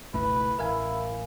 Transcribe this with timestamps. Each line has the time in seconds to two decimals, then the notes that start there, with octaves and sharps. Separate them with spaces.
0.14 G1 C#2 B2 A3 E4 B4
0.59 A1 E4 A#4 F5 G#5